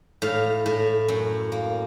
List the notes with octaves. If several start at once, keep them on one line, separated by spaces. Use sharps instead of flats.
A2 F5
A2
F#2
A#3